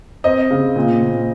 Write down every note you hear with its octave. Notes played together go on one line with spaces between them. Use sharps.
C4 D#5
C#3
A#2
A#2